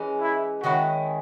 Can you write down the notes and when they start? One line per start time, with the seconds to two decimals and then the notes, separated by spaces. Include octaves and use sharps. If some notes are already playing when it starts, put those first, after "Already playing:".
Already playing: E3 G#3 C#4
0.21 E4
0.63 D#3 G#3 C#4 E4 F#4